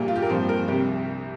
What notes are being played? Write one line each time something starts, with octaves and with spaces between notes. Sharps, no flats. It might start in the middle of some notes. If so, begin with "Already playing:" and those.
Already playing: A#1 A#2 G3 A#3 G4
F4
G4
A#4
G2 F3 C4 C5
A#4
C2 C3 G3 G4